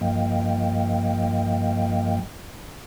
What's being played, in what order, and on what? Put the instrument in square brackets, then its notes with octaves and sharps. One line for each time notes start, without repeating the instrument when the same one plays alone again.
[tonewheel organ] G2 F3 A#3 D#5 F5 G5